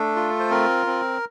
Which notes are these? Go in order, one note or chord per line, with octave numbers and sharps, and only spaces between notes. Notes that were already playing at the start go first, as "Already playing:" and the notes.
Already playing: A3 D4 A4
F4
C5
C4 A#4
C4